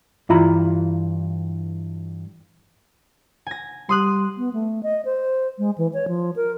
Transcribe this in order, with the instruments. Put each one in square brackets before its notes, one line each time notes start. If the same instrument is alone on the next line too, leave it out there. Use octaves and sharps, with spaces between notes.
[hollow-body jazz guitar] G2 E3 E4 F4 A#5 B5
[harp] G#5 A#6
[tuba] G3 [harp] C6 D#6 F#6
[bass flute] B3
A3
D#5
C5
G#3
E3
C#5
F3
A#4